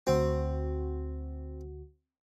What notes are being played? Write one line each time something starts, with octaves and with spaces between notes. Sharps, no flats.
D2 C4 F#4